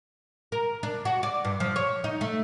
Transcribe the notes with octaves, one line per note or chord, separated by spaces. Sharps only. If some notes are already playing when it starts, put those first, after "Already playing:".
A#4
D4
F#4
D5
G2
F3
C#5
D#4
A3